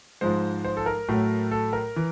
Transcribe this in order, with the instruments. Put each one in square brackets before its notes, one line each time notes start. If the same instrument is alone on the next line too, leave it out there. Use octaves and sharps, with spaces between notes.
[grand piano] G#2 F3 G#3 C5
C5
A4
A#4
A2 F#3 A3
A4
A#4
E3